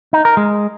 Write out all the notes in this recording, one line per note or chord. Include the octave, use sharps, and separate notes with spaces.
D#4
A#4
G#3